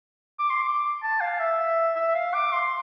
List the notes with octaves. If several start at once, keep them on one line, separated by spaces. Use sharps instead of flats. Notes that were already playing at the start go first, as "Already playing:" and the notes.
D6
C6
D6
A5
F5
E5
E5
F5
D6
C6